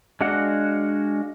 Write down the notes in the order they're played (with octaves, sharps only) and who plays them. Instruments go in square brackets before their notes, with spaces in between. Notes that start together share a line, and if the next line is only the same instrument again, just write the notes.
[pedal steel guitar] G#3 D4 F#4 F5 F#5